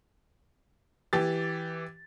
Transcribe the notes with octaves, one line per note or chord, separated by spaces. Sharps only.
E3 G4 A6